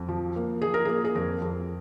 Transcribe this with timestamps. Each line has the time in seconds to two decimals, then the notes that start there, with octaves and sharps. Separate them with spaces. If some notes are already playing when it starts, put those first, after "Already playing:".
Already playing: F2
0.09 F3
0.36 A#3
0.62 F3 G#4
0.74 A#4
0.85 A#3 G#4
1.05 G#4
1.15 F2 A#4
1.42 F2